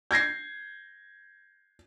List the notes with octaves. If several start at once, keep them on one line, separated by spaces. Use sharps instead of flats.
G6 G#6 A#6 C7